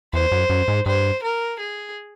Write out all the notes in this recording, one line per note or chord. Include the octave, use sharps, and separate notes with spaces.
E2 C5
F#2
F#2
G#2
G2 C5
A#4
G#4